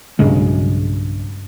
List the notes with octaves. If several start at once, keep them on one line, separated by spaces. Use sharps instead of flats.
B1 G2 C#3 G#3